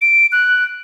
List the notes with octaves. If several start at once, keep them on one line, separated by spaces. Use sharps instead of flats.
D7
F#6